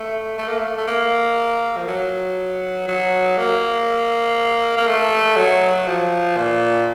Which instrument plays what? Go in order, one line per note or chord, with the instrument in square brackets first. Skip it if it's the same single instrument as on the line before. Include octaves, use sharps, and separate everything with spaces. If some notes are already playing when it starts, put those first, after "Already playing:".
Already playing: [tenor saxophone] A3
A3
A#3
A3
A3
A#3
F3
F#3
F#3
A#3
A#3
A3
F#3
F3
A#2